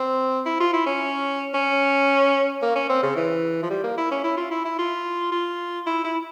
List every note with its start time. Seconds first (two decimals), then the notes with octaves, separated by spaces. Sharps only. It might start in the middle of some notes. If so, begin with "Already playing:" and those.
Already playing: C4
0.46 E4
0.60 F4
0.73 E4
0.86 C#4
1.54 C#4
2.62 A#3
2.75 C#4
2.89 C4
3.02 C#3
3.16 E3
3.62 F3
3.70 G3
3.83 A#3
3.98 E4
4.11 C#4
4.24 E4
4.37 F4
4.51 E4
4.64 E4
4.78 F4
5.32 F4
5.86 E4
6.04 E4